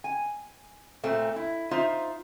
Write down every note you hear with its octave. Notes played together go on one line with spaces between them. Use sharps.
G#5
A#2 A3 C4
E4
D#4 F4 C5 E5